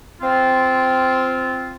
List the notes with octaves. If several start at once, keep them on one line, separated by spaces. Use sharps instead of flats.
C4 F4